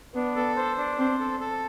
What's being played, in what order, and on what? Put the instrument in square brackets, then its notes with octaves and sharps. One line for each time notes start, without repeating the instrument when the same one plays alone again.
[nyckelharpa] B3 [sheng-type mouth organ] D4
[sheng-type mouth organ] A4
C5
D4
[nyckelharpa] C4 [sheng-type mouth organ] C5
[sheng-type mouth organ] A4
A4